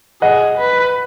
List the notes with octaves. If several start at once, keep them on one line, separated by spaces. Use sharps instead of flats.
G#4 D#5 F#5
B4